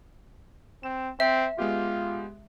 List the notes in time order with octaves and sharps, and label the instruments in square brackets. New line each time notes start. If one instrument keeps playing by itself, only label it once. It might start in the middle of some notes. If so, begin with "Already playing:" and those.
[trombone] C4 [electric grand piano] E7
[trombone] C4 [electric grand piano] C5 [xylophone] E5
[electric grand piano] G#3 B3 G4 [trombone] F4